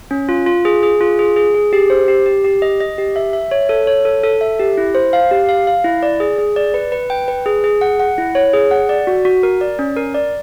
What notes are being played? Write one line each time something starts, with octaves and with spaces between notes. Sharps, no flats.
C#4
F4
F4
G#4
G#4
F4
G#4
G#4
G#4
G4
C5
G4
G4
G4
D#5
D#5
G4
E5
E5
C#5
A4
C#5
A4
A4
E5
G4
E4
C5
F5
G4
F5
F5
E4
D5
G#4
G#4
D5
B4
B4
G5
B4
G#4
G#4
F#5
F#5
E4
C#5
G#4
F#5
D5
F#4
F#4
A#4
D5
C#4
A#4
D5